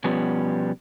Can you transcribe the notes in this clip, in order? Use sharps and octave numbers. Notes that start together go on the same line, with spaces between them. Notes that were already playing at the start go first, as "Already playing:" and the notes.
B2 F3 G3 B3 C#4